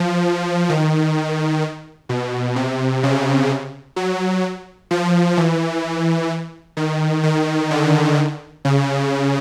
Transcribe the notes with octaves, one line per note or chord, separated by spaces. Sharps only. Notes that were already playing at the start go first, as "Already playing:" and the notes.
Already playing: F3
D#3
B2
C3
C#3
F#3
F3
E3
D#3
D#3
D3
C#3